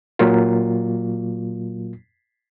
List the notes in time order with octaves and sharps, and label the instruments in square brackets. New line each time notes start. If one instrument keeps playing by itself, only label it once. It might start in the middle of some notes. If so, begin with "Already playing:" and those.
[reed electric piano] A#2 F#3 A#3 F4